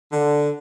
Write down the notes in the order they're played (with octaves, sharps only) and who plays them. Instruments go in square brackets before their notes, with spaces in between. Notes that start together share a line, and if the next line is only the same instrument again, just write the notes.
[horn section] D3